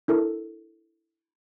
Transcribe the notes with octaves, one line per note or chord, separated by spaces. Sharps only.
D4 E4 A4 A#4